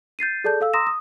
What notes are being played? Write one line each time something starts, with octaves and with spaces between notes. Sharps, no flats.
G6 A6 C7 D#7
G#4 A4 D5 A5 G6
A4 F5 E6
A#5 C6 D#6 E6 A#6 E7
D#6